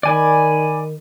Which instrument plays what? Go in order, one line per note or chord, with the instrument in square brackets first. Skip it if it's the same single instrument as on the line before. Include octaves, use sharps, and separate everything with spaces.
[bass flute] D#3 [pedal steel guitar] D5 G#5 B5